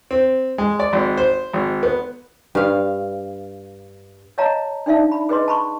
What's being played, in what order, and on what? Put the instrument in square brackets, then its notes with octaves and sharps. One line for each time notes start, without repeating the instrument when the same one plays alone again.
[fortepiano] C4
G#3
D5
G#1
C5
G#1
B3
[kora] G2 F5
[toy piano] C#5 D#5 F5 A5 A#5
D4 D#4 D5 E5 F5 A5
B5
G#4 B4 D#5 C6
A5 B5 C#6